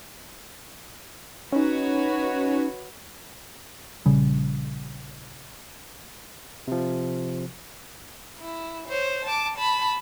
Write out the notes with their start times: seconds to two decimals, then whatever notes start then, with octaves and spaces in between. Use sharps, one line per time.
1.52 C#4 D#4 F#4 B4 C#5
4.06 A#1 C#3 G3
6.67 C3 F3
8.40 E4
8.88 C5 C#5
9.25 A5 D6
9.57 A5 B5